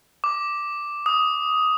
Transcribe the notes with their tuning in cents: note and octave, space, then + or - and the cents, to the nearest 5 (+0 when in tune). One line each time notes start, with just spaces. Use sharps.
D6 +0
D#6 +10